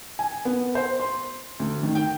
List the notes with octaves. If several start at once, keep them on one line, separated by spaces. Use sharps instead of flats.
G#5
B3
C5
C6
D2
D#3
G5